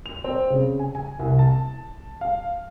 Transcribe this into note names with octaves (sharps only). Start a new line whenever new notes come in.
F7
C4
C#3
G#5
G#5
C2
A5
F5